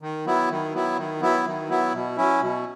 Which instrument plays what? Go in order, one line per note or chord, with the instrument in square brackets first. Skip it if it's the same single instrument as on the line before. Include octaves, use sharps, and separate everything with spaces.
[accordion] D#3
F#3 B3 E4
D#3
F#3 B3 E4
D#3
F#3 B3 E4
D#3
F#3 B3 E4
B2
F#3 C#4 E4
B2